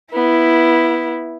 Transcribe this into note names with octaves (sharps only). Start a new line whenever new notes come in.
B3 E4